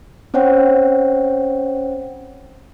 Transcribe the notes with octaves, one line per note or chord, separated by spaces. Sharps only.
C4 C#4 C5 C#5 F#5 G5